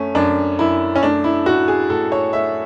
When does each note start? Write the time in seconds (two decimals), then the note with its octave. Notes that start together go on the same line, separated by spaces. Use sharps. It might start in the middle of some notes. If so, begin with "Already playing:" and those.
Already playing: F#2 A3 C#4
0.15 F#2 D4
0.59 F#2 E4
0.96 C#4
1.02 A3 D4
1.24 E4
1.46 A2 F#4
1.68 G#4
1.90 A2 A4
2.12 C#5
2.33 A3 E5